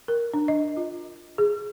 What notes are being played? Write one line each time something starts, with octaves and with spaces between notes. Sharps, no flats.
A#4
D4
D#5
F4
G#4